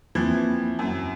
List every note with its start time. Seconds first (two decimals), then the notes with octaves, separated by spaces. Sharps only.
0.15 E2 E3 F3 A#3 C4 E4 G#6
0.79 F#2